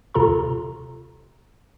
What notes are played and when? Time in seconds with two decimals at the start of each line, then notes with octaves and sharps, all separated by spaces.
0.14 D#2 C3 F4 A4 A#5 C6